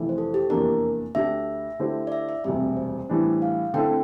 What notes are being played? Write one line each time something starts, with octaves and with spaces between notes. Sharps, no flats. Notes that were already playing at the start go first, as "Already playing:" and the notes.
Already playing: F1 F2 E3 A3 E4
C5
A4
G4
F1 E2 E3 A#3 D4 A#4
D2 D3 A3 D4 G4 E5
D3 A3 E4 G4 C5
D5
E5
E5
E1 D2 C3 G3 E5
C5
A2 E3 G3 D4
F5
D3 A3 C4 E4 A4 G5